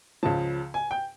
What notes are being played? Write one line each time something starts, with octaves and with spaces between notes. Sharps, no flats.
C#2 C#3 F3 A5
G#5
G5